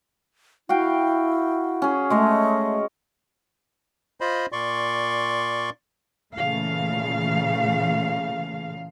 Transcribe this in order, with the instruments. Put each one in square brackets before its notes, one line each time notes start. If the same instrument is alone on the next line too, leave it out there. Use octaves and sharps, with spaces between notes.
[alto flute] E4 [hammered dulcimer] F#4 F5 G5
[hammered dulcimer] C#4 G#4
[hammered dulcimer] G#3 C#5 D#5 [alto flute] A3
[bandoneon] F4 C5 D#5 B5
A#2 D5 C6 C#6
[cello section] A#2 C#3 E3 A3 F5